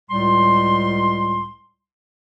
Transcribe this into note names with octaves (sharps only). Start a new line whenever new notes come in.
C#2 A2 G3 C6